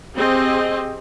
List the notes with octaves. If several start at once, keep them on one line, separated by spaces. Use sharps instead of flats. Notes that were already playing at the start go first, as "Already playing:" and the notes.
C4 G4 G#4 D#5